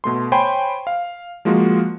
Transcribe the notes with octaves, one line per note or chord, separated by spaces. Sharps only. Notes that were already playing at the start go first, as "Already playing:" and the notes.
B2 A3 C6
C5 C#5 G5 G#5 B5 C6
F5
F3 G#3 A#3 F4 F#4